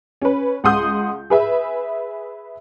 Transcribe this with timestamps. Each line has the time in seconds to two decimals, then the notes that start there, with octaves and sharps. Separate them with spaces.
0.22 C#4 B4
0.64 C#2 F#5 C6 D#6 G6
1.30 G#4 B4 E5